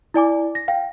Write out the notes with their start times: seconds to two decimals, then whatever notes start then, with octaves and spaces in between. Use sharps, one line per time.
0.14 E4 D5 G#5 D6
0.55 A#6
0.68 F5 G5